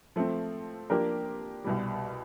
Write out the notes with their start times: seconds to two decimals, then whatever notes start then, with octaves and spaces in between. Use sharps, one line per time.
0.16 F3 A3 C4
0.90 F3 A#3 D4 G4 A#4
1.64 C2 B2 G3